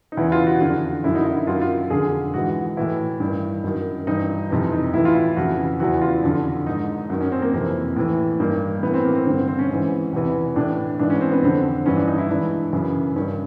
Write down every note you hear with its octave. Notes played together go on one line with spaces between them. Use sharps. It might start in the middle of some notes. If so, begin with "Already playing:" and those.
D#4
E2 C#3 E3 E4
F4
F#4
F2 D3 F#4
F#2 D3 E4
D#4
E4
E4
F#2 D#3 F4
F4
F2 D3 G#4
G#2 E3 F#4
A2 E3 E4
G2 D#3
F#2 D#3
G2 E3 D#4
F2 C3 E3 D#4
D#4
A2 E3 E4
F4
E4
F2 C#3 E3 F#4
E2 C#3 E3 F#4
F4
F2 D3
G#2 D#3 D#4
F#2 D#3
C#4
C4
A#3
F2 C3 E3
A2 E3
G2 D#3 A#3
A2 E3 B3
C4
A#3
C4
G2 D3 C4
C4
C4
C#4
G#2 E3
E2 C3 E3
A2 E3 D4
G#2 E3 D4
C#4
C4
B3
F2 D3 C4
G2 E3 C#4
D4
D#4
E4
G#2 E3 D4
F#2 C#3 E3
G2 D#3 C#4